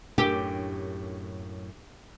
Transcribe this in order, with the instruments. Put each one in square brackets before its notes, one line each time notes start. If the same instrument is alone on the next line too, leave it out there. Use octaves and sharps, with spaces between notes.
[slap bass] F#2 A2 [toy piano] D4 A#4 [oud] G4